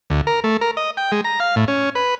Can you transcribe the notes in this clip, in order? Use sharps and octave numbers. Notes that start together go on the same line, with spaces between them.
D2
A#4
A3
A#4
D#5
G5
G#3
A#5
F5
A2
C#4
B4